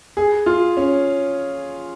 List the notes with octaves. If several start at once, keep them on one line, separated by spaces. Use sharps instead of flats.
G#4
F4
C#4